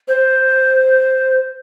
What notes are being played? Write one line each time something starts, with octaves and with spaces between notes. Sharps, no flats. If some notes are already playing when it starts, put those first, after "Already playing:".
C5